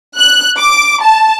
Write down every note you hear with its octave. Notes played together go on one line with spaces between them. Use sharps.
F#6
D6
A5